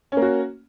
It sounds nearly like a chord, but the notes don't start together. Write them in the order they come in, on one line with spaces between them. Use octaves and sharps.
C#4 A#3 F#4